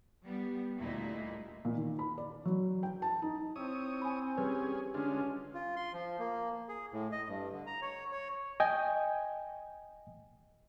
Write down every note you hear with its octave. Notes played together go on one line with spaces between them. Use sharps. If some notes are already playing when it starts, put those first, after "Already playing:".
G3 B3
D2 A#2 G3 A#3 D#4 E4
A#2
D#3
B5
D5
F#3
G5
A5
D#4
C4 E4 C#5 D#6 E6
G#5 B5
G3 C#4 G#4 B4 C#5
D3 G#3 C#4 D4 F4
F4
C6
F3
A#3
G#4
A2
D#5
G2
D3
A#5
C#5
C#5
D#5 G5 G#5